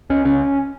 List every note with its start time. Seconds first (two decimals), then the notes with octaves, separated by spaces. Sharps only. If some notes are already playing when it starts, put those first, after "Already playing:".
0.10 C#2 C#4
0.25 C#3 C#4